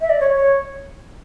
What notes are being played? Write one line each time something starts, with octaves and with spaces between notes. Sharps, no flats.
E5
D5
C#5
C#5